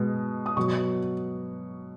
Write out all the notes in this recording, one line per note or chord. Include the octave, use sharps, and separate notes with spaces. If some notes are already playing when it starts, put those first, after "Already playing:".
Already playing: B2 G#3
D#6
B2 F#3 C#6